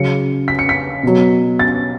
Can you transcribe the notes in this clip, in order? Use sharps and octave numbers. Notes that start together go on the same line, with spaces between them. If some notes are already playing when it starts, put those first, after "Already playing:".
Already playing: C#3 F#3 C#7
B6
C#7
B6
B2 F#3
A6